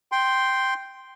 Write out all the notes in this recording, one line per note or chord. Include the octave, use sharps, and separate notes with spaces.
G5 C6